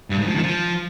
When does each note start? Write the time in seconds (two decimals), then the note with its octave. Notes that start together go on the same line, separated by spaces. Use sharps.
0.10 G2
0.19 G#2
0.27 F3
0.35 D#3
0.43 F3